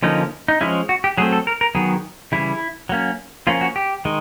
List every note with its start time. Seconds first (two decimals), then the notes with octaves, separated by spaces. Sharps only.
0.03 D3 F3 A#3 C#4 D#4
0.48 D#4
0.61 F3 G#3 C#4 E4
0.89 F#4
1.04 G4
1.18 F#3 A3 C4 G#4
1.32 A4
1.47 A#4
1.61 A#4
1.75 D#3 F#3 B3 G#4
2.32 C#3 E3 G3 E4
2.89 F#3 A#3 C#4
3.47 F3 A#3 C#4 F4
3.61 F#4
3.76 G4
4.05 D#3 G#3